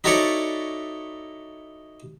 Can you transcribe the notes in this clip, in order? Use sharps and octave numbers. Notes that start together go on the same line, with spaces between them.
D#4 E4 F#4 A4 C#5 D5